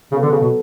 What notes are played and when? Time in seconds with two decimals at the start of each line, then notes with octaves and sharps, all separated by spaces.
0.11 C#3 F#3 B3 F#4 A4
0.22 D3
0.31 C#3
0.41 B2